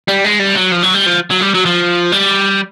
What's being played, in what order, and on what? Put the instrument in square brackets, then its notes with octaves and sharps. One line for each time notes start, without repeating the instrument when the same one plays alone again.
[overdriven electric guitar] G3
G#3
G3
F#3
F3
F#3
G3
F3
F#3
G3
F#3
F3
G3